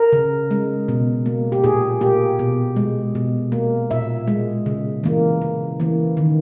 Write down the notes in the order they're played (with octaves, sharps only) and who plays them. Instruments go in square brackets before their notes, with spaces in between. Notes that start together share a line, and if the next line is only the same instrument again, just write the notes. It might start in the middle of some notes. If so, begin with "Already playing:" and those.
Already playing: [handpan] A#4
C#3
G#3
B2
A#3
G4
A#2 G#4
A#3 G4
B2
G#3
B2
A#3
A#2 E5
G#3
C#3
E3 A#3
C#3
E3 A#3
D#3